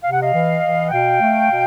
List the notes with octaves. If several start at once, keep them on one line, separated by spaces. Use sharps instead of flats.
C3 F5
F#5
D#5 F5
E3
E3
F#5
B2 F5 G5
A3
B2